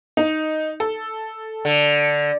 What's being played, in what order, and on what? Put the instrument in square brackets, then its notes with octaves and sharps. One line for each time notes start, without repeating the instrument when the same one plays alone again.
[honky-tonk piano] D#4
A4
[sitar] D3